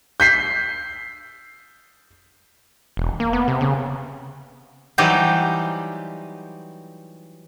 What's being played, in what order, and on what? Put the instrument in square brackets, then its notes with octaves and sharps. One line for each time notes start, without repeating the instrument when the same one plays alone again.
[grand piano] G6 B6 C7
[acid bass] E1
A#3
B3
C3
C#3
[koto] E3 F#3 G3 D#4 G4 C5